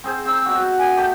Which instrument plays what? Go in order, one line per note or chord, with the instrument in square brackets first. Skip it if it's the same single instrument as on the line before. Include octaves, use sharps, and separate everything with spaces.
[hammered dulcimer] C4 G#4 C5
[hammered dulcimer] C4 D#4 [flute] E6
[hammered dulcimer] B2 F#4
[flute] G#5
[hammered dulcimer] A3 G4